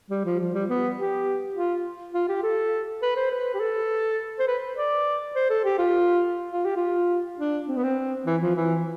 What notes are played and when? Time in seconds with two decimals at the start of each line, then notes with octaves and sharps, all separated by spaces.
0.10 G3
0.25 F3
0.39 F3
0.54 G3
0.69 B3
0.97 G4
1.56 F4
2.14 F4
2.28 G4
2.43 A4
3.02 B4
3.16 C5
3.31 B4
3.54 G4
3.60 A4
4.39 C5
4.47 B4
4.77 D5
5.35 C5
5.50 A4
5.64 G4
5.78 F4
6.52 F4
6.65 G4
6.77 F4
7.39 D4
7.68 C4
7.76 B3
7.83 C4
8.26 E3
8.42 F3
8.56 E3